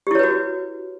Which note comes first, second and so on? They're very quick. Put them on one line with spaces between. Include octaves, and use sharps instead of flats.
G4 E4 C#5 B4 F#4